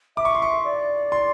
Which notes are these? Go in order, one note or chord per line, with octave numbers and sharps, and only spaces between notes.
E5 D6
C#6
C6
C#6
D5
C6